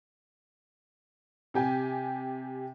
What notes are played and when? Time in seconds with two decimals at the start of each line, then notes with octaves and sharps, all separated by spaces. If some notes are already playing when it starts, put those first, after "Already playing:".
1.54 C3 G4 G#5